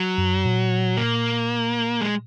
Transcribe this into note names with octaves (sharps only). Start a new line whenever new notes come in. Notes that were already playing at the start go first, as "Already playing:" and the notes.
Already playing: F#3
F#2
A#2
A#3
G#3